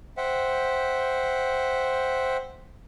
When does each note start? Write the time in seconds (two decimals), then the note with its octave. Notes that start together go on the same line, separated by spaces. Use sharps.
0.17 C5 E5 F#5 G5